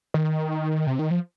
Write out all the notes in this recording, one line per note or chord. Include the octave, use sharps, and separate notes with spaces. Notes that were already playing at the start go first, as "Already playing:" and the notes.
D#3
C3
D#3
F3